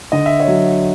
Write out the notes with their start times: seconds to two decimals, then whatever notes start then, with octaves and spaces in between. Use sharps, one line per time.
0.12 D3 D#5
0.26 E5
0.40 C#5 D#5
0.47 F#3